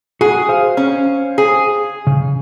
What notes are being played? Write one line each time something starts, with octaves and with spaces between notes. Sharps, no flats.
F#4 G#4 F#5
C5 F5
C#4
G#4
C#3